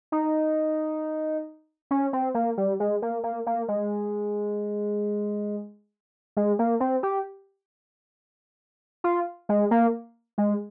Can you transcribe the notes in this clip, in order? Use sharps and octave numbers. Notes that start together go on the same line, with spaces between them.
D#4
C#4
C4
A#3
G3
G#3
A#3
A#3
A#3
G#3
G#3
A#3
C4
G4
F4
G#3
A#3
G#3